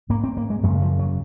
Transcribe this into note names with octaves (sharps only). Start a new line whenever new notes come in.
G#2 A#3
C4
A#3
G#3
F#2 F#3
C#3
F3
F#3